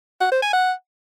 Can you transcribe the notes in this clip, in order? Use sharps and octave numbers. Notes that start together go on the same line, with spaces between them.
F#5
C5
G#5
F#5